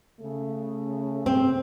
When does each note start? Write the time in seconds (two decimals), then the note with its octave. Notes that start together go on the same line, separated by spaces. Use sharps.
0.21 C#3 A3
1.26 C4